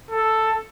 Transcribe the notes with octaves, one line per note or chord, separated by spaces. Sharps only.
A4